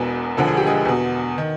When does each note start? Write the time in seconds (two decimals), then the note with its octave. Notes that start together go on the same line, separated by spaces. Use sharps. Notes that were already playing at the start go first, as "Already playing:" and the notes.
Already playing: E1 E2 B2
0.37 E1 D2 D3 F3 A4
0.48 G#4
0.57 G4
0.66 G#3 G#4
0.85 E2 B2
1.38 D#3